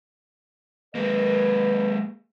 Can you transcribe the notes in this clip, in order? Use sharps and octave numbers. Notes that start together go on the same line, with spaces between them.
G#3 A#3 A#4 B4 D#5